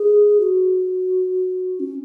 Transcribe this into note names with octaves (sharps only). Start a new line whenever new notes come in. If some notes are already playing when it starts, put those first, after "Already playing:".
Already playing: G#4
F#4
C#4